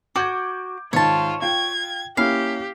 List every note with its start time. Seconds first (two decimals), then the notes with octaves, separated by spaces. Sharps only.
0.16 F#4 D6 G6 G#6
0.93 G#2 D#3 F4 C#5 A5
1.42 F4 G5 G#6
2.17 A#3 C#4 E4 G4 F5